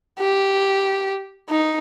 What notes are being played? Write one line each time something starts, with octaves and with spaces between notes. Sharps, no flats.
G4
D#4